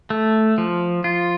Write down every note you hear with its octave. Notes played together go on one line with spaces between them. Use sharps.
A3
F3
F4